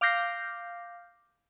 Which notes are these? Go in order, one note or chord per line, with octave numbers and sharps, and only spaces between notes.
F5 D6 F6 G6 A#6 C7